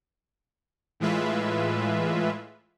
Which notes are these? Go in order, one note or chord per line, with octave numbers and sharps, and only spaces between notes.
A2 E3 G#3 F4 B4 E5